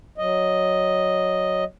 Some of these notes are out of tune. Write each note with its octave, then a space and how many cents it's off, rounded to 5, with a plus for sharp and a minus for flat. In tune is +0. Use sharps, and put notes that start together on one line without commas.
F#3 +0 D#5 +0